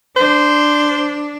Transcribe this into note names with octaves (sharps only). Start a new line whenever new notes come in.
D4 C5